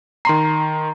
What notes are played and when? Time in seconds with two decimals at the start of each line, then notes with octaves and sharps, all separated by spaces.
0.25 D#3 A#5 C6 C7